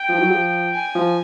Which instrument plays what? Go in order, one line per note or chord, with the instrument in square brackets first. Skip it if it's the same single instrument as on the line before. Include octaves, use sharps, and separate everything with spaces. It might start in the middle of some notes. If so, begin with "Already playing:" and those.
Already playing: [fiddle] G5
[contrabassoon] F3
F#3
F3
[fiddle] G#5
[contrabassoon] F3